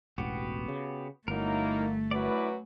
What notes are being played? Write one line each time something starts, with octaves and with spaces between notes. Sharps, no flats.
E1 A1 B3 F#4 G4
C#3
G1 F#3 A3 A#3 D#4 E4 A#4
F#2 E4 F#4 B4 D5